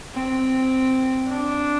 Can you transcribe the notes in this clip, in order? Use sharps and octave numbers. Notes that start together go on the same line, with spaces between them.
C4
D4